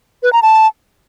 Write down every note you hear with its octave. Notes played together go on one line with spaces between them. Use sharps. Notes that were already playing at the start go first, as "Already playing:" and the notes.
B4
A#5
A5